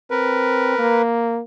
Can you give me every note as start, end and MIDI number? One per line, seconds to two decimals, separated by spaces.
0.11 0.76 60
0.11 1.02 70
0.11 1.02 71
0.78 1.40 58